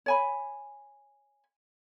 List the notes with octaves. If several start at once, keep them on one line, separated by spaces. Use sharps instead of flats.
C#5 G#5 B5